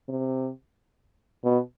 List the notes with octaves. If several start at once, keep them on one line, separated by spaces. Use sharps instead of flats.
C3
B2